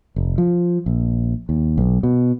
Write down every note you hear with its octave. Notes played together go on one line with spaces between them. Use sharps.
F1
F3
A#1
D#2
B1
B2